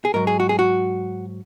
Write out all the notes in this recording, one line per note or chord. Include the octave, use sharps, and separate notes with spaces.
G#4
G#2 F#3 A#4
G#4
F#4
G#4
F#4